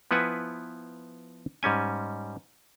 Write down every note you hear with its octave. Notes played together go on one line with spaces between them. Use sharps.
F3 B3 E4 B4 F#5 G#5
G#2 G3 C#4 G#5